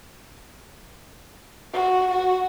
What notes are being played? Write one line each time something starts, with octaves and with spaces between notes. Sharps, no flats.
F#4
F#4